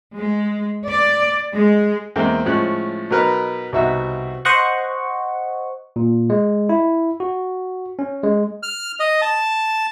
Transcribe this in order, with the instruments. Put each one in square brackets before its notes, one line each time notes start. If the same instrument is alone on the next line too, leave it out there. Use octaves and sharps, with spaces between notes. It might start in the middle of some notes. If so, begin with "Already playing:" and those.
[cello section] G#3
D5
G#3
[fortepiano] E2 G#3 A#3 C4
A2 F3 G#3 C#4 F#6
B2 F#3 D#4 A#4 B4 F6
C2 B2 D#4 F#4 E5 E6
[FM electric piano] C5 D#5 F#5 C#6
[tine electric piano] A#2
G#3
E4
F#4
C#4
G#3
[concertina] F6
D#5
A5